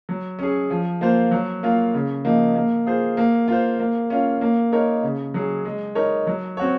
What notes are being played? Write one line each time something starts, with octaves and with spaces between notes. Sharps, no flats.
F#3
C#4 G#4
F3
A#3 F4 C5
F#3
A#3 F4
C#3
F3 A#3 D#4
A#3
F4 G#4 C5
A#3
F4 C5
A#3
C#4 F4
A#3
D#4 A#4 C#5
C#3
F#3 C#4 G#4
G#3
D#4 A#4 C#5
F#3
C4 F#4 C#5